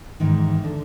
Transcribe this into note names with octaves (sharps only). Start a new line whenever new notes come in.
E2 G#2 D#3
D3